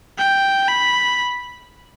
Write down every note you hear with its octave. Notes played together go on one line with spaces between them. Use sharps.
G5
B5